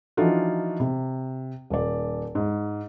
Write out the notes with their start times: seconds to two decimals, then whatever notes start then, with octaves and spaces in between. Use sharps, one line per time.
0.17 E3 F3 D4 D#4 F4 F#4
0.80 C3
1.70 D#1 D5
2.35 G#2